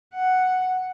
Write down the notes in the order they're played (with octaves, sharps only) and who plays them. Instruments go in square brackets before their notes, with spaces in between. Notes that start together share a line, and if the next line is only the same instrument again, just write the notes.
[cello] F#5